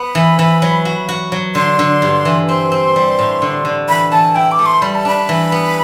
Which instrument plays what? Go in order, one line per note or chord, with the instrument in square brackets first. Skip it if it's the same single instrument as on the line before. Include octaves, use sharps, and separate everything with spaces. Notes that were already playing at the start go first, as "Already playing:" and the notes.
Already playing: [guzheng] B3 [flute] B5
[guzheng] E3
E3
F#3
F#4
F#4
F#3
[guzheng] D3 [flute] C6
[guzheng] D3
G2
E3
[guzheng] C4 [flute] C6
[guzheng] C4
G3
A2
D3
D3
[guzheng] E3 [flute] B5
[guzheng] E3 [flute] A5
[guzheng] E4 [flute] G5
[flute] D6
[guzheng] A3
[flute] C6
[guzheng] G3 [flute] B5
[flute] A5
[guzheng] D4 [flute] B5
[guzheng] E3
B3